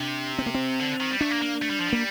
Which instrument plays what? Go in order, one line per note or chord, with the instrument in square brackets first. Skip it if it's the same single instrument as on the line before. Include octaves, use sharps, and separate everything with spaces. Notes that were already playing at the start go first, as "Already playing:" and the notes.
Already playing: [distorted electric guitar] C3 [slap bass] D4
[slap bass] C4
A#3
C4
[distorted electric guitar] D3
D#3
G3
[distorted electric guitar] A3 [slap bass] D4
[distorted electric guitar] A#3
A#3
A3
G3
F3
[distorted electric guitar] G3 [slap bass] A#3